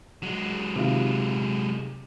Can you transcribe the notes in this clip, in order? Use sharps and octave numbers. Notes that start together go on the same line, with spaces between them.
F#3 G#3
C3 D#3 F4